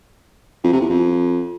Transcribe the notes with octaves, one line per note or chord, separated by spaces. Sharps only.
F2
C3
E2
F2